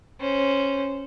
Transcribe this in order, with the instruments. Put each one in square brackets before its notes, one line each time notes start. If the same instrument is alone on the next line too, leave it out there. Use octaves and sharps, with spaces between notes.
[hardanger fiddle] C#4 C5